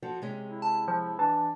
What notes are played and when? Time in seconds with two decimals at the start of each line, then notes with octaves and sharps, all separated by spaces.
0.02 F3 F#4 A4
0.22 C3 G#3 C#4
0.50 E4
0.62 A5
0.88 F3
1.19 E3 D4 A5